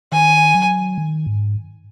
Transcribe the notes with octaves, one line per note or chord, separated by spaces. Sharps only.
D#3 G#5
F#3
D#3
G#2